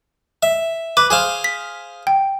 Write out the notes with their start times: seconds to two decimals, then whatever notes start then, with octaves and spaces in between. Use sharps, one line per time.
0.43 E5
0.97 B4 D6
1.10 G#4 C5 F5
1.44 B6
2.07 G5